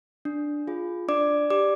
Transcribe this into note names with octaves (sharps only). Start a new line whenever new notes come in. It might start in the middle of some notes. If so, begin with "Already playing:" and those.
D4
F4 G#4
D4 D5 D6
G4 D5 D6